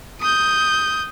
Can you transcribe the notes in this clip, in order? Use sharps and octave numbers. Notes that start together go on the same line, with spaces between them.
D#6 G6